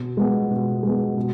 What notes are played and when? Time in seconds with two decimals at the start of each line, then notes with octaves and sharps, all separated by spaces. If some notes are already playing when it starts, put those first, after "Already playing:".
Already playing: B2
0.17 G#3 B3
0.51 B2
0.83 G#3 B3
1.17 B2